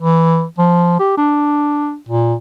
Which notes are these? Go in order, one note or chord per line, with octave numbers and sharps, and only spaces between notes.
E3
F3
G4
D4
A#2